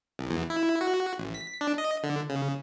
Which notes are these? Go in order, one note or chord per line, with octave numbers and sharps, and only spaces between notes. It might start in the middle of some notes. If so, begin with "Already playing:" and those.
C2
E2
E4
F#4
A1
B6
D4
D#5
D3
C#3